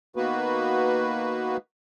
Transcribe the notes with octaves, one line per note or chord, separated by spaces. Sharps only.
D#3 A#3 B3 F#4 B4